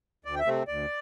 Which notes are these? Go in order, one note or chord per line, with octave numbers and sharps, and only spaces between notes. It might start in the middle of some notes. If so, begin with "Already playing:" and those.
D2 D5
G5
E5
C3 A3 C4
D2 D5